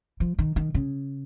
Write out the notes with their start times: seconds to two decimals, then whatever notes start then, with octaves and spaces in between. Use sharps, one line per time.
0.20 F3
0.39 D#3
0.56 D#3
0.74 C#3